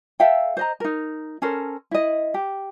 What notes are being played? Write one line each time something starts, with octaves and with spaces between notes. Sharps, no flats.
A4 E5 F5 G5
C5 D#5 A#5
D#4 A#4
C#4 A4 A#4 C5
E4 D#5
G4